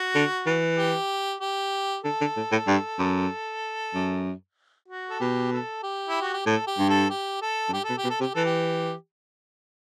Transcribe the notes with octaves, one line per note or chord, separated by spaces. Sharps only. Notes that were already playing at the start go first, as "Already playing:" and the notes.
Already playing: F#4
D3
E3
G4
G4
D3 A4
D3
A2
A2
G2
F#2
F#2
F#4
A4
B2 G4
A4
G4
E4
F#4
G4
A2 A4
G4
G2
A4
G4
A4
F#2
G2 G4
B2 A4
G4
B2
A4
C3 G4
E3 A4
G4